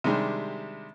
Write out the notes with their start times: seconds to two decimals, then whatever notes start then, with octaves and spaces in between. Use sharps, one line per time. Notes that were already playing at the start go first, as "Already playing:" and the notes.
0.04 C3 D#3 G3 G#3 D4